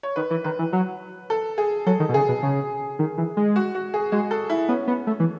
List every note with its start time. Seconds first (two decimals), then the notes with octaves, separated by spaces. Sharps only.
0.03 C#5
0.16 D#3 B4
0.30 E3
0.44 D#3 B4
0.59 E3
0.73 F#3
1.30 A4
1.58 G#4
1.86 F#3 A4
2.00 D#3
2.09 B2
2.14 C#3 G#4
2.28 B2
2.43 C#3
2.99 D#3
3.18 E3
3.37 G#3
3.56 F#4
3.75 F#4
3.94 G#4
4.12 G#3 F#4
4.31 A4
4.50 E4
4.69 B3 C#4
4.88 B3
5.07 A3
5.20 E3